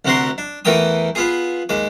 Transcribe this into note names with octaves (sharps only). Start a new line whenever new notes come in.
D2 C3 F#4 A#4 C6
D4
E2 E3 A3 A#4 G5 D#6
B3 F4 G#4
D#2 G#3 D6